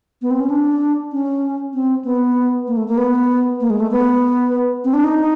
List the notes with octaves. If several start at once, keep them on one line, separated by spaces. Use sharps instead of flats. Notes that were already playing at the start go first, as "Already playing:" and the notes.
B3
C4
C#4
D4
C#4
C4
B3
A#3
A3
A#3
B3
A#3
G#3
A3
B3
C4
D4
D#4